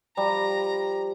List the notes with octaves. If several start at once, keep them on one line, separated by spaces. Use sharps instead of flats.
F3 G3 A#5